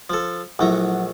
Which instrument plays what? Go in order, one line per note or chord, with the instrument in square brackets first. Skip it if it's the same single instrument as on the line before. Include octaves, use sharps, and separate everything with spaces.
[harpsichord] F3 A4
[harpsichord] A#1 A3 A#5 [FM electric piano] F#3 E4 F#5